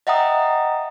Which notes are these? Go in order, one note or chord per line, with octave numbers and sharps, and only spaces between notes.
D#5 E5 F#5 G5 A#5 D#6